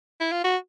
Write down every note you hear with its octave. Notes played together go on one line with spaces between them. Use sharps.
E4
F4
F#4